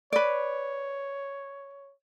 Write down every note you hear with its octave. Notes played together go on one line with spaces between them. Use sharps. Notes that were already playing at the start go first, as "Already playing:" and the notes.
B4 C#5 D5